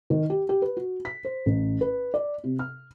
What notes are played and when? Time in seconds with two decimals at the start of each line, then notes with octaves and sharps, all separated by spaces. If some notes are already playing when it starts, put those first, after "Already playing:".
0.10 D#3
0.30 G4
0.49 G4
0.62 B4
0.77 F#4
1.05 B6
1.25 C5
1.46 A1
1.81 B4
2.14 D5
2.44 C3
2.59 F6